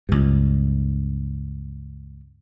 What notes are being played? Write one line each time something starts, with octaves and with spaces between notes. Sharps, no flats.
C#2 G2